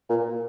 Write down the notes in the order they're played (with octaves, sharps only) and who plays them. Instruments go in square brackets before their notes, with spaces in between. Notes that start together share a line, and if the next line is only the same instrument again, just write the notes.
[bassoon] A#2